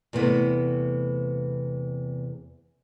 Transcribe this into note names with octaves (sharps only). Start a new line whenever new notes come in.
E2 C3 A3 B3 E4